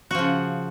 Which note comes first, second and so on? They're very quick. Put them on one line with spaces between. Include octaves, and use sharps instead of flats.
F#4 F3 C#3